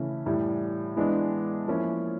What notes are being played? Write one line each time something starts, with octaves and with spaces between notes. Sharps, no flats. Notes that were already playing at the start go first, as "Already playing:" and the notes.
Already playing: C#3 E3 A3 C#4 E4
A2 E3 G3
E3 G#3 B3 D4
F3 A#3 C#4 E4